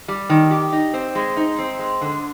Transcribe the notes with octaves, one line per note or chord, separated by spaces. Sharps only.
G3
D#3
G4
D#4
C4
G#3
D#4
C4
G#3
D3